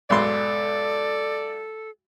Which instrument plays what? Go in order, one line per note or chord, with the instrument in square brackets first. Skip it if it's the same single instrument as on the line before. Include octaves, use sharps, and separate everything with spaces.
[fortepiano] B1 G#2 C6 [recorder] A4 [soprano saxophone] D5